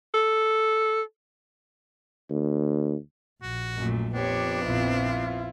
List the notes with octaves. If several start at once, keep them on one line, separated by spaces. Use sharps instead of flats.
A4
D2
A#1 F#4
F#2 A#2 A3
F2 B3 D4 G4 C#5
A#1 C4 E4 F4